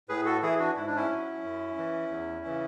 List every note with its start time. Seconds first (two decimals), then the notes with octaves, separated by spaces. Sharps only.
0.09 A2 G#4 B4
0.25 F#4 A4
0.43 E3 E4 G#4
0.59 D4 F#4
0.76 G#2 E4
0.87 D4
0.96 C#4 E4
1.10 F#3
1.44 F#2
1.78 E3
2.10 E2
2.45 C#3 E3